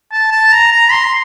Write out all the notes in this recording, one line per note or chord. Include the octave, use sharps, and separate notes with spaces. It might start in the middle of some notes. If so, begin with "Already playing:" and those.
A5
A5
A#5
A#5
C6